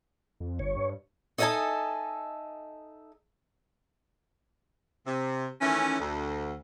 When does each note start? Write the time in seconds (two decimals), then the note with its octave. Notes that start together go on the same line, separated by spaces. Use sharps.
0.40 F2
0.59 G1 C#5
0.77 G2
1.38 D#4 A4 D#5 E5 G#5 A5
5.06 C3
5.61 D#3 E3 A3 C#4
5.99 D2